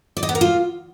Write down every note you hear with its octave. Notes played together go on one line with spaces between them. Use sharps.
D5
D#5
B3
A#4
F4